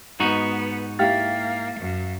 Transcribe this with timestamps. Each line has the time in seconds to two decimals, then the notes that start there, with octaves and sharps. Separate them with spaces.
0.20 G#2 B3 D#4 F#4
0.99 A#3 E4 G4 F5 F6 A6
1.79 F#2